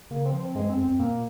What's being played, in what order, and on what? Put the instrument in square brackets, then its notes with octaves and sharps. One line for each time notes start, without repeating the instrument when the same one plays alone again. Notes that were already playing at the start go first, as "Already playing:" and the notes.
[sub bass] C#3 [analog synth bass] A#3
[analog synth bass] C4
[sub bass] F3
[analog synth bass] C4
[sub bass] G2 [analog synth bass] G#3
[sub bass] F2 [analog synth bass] C4
[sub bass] F2 [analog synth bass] C4
[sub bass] A#2 [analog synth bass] A#3